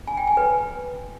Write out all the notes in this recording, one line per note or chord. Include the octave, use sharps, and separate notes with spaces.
G#5
G5
G#5
B4